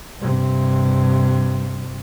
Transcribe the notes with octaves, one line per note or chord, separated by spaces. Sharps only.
G2 C3